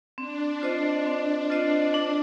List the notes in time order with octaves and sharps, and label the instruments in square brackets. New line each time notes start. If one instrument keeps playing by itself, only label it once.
[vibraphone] C4 [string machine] D4
[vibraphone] F4 C5 D#5
C4
F4 C5 D#5
D4